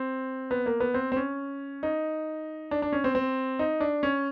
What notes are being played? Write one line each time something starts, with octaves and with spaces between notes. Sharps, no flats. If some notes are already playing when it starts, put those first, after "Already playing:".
Already playing: C4
B3
A#3
B3
C4
C4
C#4
D#4
D4
D4
C#4
C4
C4
D#4
D4
C#4